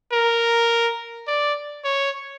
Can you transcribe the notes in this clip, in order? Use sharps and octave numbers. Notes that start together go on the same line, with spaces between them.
A#4
D5
C#5